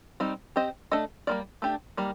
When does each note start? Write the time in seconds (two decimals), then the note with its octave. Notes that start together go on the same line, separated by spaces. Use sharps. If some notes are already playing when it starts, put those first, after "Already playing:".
0.20 G3 C4 D#4
0.56 C4 G4 C5 D#5
0.91 A3 D4 A4 D#5
1.27 G3 A#3 F4 A#4 D5
1.62 A3 D4 G4
1.97 D#3 G3 A#3